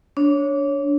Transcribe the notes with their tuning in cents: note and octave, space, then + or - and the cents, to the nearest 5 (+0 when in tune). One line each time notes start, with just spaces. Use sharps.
D4 -20 C#5 +0